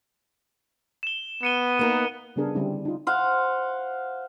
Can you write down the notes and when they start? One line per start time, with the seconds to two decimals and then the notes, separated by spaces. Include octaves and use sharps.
1.03 E7 G7
1.43 B3 C#7 D#7 G7
1.79 A#3 D#4 A#4
2.36 C#3 G3 B3 D4 G#4 A#4
2.54 D3 G3 C4 C#4 E4
2.85 D#4 F4
3.07 C5 F5 F#5